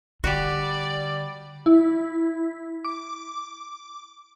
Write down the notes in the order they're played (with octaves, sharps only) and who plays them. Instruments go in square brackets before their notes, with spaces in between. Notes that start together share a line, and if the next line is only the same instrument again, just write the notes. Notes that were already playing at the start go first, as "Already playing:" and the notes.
[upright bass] D3 [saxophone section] G3 [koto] F#4 G4 [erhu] D5
[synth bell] E4
D6